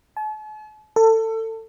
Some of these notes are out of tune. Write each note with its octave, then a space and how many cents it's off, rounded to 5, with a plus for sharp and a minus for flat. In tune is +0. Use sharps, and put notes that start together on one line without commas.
A5 -45
A4 +25